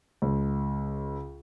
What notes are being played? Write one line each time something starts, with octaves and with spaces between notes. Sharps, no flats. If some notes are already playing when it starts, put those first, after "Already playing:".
C#2